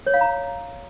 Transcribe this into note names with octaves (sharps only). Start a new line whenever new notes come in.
C#5
F5
A#5